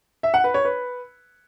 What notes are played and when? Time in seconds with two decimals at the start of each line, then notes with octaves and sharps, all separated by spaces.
0.23 E5
0.34 F#5
0.44 B4
0.54 C#5
0.65 B4